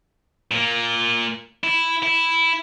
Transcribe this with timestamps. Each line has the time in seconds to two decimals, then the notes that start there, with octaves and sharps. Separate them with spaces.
0.51 A#2 A#3
1.64 E4
2.03 E4